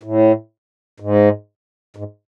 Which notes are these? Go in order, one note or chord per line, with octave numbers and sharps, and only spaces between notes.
A2
G#2
G#2